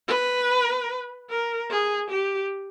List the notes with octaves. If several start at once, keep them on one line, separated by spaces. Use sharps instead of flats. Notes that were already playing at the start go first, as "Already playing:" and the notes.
B4
A#4
G#4
G4